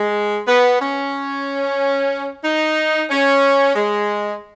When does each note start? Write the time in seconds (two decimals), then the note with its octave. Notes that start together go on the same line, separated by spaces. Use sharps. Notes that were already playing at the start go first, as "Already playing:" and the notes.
Already playing: G#3
0.46 B3
0.80 C#4
2.43 D#4
3.10 C#4
3.75 G#3